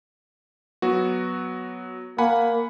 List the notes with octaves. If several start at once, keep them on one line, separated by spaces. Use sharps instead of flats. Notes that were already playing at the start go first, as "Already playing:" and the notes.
F#3 B3 F#4
A#3 F#5 G#5 B5